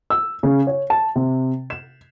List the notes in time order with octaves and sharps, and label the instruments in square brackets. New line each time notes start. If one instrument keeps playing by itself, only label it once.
[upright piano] E6
C#3
C#5
A5
C3
E7